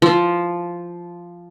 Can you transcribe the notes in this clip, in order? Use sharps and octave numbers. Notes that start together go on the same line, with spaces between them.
F3